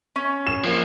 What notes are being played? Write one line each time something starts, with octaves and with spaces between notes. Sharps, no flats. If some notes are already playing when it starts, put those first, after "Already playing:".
C#4
E7
F3 A#3